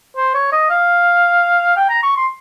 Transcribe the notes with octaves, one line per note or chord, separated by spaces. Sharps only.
C5
C#5
D#5
F5
G5
A#5
C#6
C6